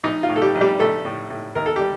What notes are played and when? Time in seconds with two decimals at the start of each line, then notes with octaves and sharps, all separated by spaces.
0.04 A#1 D#4
0.23 F4
0.28 A2
0.36 A4
0.42 G3 G4
0.55 A#1
0.61 G3 G4
0.79 A#1 A3 A4
1.05 A2
1.30 A2
1.55 D#2 A#4
1.66 A4
1.76 G3 G4